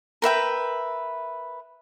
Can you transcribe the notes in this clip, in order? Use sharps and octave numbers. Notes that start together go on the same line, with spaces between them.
A#4 B4 E5 G5